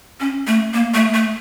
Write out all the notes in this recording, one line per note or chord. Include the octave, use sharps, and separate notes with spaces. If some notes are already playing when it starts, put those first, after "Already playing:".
C#4
A3
A#3
A3
A3